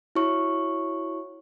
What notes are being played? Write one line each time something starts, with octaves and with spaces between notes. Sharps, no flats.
E4 F#4 C#5 C#6